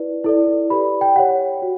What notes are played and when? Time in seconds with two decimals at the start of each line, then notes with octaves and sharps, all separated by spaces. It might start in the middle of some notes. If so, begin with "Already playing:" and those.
Already playing: E4 B4 D5
0.24 E4 A4 D5
0.70 G4 B4 D5 B5
1.01 G5
1.16 G4 C#5 F#5
1.62 F#4